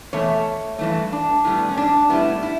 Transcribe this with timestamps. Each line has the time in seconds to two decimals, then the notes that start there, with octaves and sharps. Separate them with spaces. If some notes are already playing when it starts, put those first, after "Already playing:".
0.13 E2 B2 A3 C#5
0.79 G2 E3 A3
1.12 D4
1.45 A2 G3 B3
1.70 C#4
1.77 D4
2.10 A2 G3 B3 E4
2.43 E4